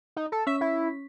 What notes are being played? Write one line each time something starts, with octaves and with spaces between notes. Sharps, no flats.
D#4
A4
C#4 E5 B6
E4